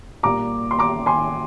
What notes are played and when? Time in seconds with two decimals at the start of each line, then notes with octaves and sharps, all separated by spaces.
0.23 A#2 G3 A#3 A#5 D6
0.71 C6
0.79 A#5 D6
1.06 G#5 C6